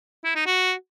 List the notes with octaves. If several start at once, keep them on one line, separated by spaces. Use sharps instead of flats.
E4
D#4
F#4